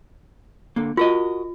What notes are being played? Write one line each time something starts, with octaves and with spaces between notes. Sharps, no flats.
D3 A#3
F4 F#4 A#4 D#5